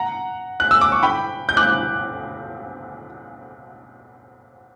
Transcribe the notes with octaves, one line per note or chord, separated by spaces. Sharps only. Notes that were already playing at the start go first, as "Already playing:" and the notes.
Already playing: F#5 A#5
F#6
E6
D6
C#6
G5 B5
G6
D6 F#6